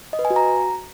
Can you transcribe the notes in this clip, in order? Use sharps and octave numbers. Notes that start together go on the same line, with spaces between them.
D#5
B4
G#5
F#4
A#5